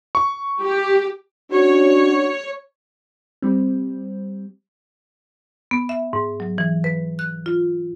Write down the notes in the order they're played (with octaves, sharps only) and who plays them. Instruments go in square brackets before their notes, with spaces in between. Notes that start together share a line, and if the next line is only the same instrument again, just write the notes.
[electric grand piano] C#6
[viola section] G4
[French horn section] C#4 D4 F#4 [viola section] C#5
[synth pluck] G3 C4
[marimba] B3
E5
G#2
F#3
E3
B4
F#6
F4